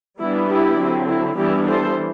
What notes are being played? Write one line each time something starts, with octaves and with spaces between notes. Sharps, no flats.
E3 G3 B3 D4 E4
E4 G4
D3 F#3 C4
E4
E3 G3 B3 D4 E4 G4
A4 C5